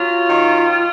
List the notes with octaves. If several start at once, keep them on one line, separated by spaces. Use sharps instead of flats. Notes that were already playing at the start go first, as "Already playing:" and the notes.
Already playing: F#3 F4
D#3